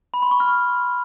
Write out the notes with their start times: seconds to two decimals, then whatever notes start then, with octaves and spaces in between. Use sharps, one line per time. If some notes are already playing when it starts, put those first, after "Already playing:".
0.14 B5
0.22 C6
0.31 C#6
0.40 F6